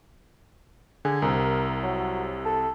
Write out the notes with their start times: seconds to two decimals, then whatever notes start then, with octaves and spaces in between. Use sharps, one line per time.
1.05 D3 G#4
1.22 C2 C3 A#4
1.83 F#3
2.45 A4